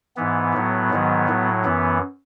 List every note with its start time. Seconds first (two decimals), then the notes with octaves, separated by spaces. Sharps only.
0.16 G#2 E3 B3
0.53 A2 F#3
0.90 G#2 D#3 F#3
1.28 A2 F#3
1.65 F#2 E3 B3